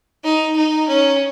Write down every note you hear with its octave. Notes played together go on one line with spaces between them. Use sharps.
D#4
D#4
C#4